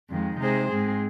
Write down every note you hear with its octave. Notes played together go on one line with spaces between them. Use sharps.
F2 D#3 G#3
C3 G#3 D#4 G#4 C5
G#2 G#3 C4 G#4